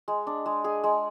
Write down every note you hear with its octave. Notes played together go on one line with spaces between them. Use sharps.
G#3
D4
G#3
G#4
G#3